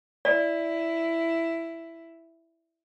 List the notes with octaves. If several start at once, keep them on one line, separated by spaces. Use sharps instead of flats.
E4 D5